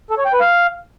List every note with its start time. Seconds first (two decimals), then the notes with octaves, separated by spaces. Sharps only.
0.10 A4
0.18 C#5
0.25 G5
0.33 B4
0.40 F5